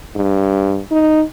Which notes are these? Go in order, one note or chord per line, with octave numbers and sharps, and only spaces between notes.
G2
D#4